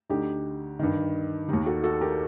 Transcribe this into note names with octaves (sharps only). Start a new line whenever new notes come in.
D2 D3 D#4 G4
G2 D#3
D#2 D#3 D#4 G4
F#4 A4
F#4 A4
G4 A#4